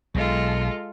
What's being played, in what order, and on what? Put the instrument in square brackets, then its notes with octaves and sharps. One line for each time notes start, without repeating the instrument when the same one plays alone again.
[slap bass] B1 [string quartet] G#3 F4 A4